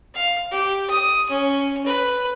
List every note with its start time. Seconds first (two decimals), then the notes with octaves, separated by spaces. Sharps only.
0.15 F5
0.51 G4
0.90 D#6
1.30 C#4
1.86 B4